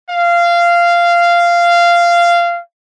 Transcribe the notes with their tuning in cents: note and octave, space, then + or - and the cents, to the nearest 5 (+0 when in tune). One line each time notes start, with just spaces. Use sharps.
F5 -15